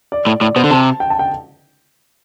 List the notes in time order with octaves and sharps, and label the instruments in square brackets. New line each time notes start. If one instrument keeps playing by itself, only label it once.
[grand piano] D5
[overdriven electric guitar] A2
[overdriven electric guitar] A2 [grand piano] D5
[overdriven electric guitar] B2 [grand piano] C5
[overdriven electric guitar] D3
[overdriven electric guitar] C3 [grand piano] A5
[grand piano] G5
A5
G5